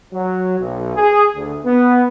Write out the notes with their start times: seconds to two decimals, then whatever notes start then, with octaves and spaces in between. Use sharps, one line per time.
0.13 F#3
0.59 B1
0.96 G#4
1.35 D2
1.65 B3